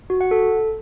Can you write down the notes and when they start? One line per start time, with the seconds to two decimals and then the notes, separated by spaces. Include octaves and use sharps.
0.10 F#4
0.21 F#5
0.31 A4